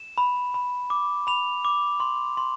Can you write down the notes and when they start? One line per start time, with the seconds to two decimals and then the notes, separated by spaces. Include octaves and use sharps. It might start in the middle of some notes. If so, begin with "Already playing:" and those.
Already playing: E7
0.18 B5
0.54 B5
0.90 D6
1.27 B5 F7
1.65 D6
2.00 C6
2.37 C6